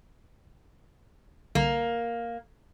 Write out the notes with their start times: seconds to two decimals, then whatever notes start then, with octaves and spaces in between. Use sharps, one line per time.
1.55 C2 D3 A#3